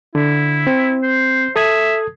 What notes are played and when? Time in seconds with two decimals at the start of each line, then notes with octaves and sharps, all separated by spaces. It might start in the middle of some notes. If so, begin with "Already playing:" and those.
0.15 D3 E4
0.67 C4
1.02 C5
1.56 A4 E5 D#6 G#6